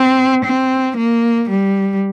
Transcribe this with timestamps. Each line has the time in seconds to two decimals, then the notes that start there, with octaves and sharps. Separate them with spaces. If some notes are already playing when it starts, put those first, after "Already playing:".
Already playing: C4
0.45 C4
0.97 A#3
1.50 G3